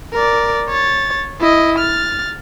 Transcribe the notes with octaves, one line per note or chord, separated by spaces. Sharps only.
A#4 D5
C#5 A6
E4 D#5
F6 A6